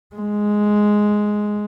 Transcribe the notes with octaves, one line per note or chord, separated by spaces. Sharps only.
G#3